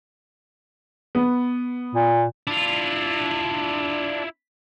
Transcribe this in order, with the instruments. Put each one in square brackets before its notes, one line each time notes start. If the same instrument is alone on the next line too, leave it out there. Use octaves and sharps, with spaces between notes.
[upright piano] B3
[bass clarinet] A#2
[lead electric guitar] D4 [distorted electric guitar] E4 F4